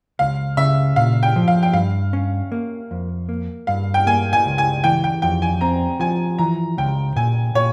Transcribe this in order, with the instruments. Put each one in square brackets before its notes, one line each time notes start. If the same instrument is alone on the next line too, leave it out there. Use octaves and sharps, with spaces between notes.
[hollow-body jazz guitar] C#2 [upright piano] F5
[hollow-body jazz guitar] C#3 [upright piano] E5
[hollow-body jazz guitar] A#2 [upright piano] F5
[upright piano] G5
[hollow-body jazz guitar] F3
[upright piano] F5
G5
[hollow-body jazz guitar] G2 [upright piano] F5
[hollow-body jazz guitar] C#4
A#3
F2
A#3
[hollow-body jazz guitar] G2 [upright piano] F5
[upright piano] G5
[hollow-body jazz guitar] A#3 [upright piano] G#5
[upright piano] G#5
[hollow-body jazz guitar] C#2
[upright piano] G#5
[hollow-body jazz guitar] E3 [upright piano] G5
[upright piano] G5
[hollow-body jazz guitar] F2 [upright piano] G5
[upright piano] G#5
[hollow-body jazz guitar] C4 [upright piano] A#5
[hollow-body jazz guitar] F3 [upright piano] G#5
[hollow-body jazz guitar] E3 [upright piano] A#5
[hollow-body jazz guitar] C#2 [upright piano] G5
[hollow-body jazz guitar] A#2 [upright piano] G#5
[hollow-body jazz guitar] A#2 [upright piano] C#5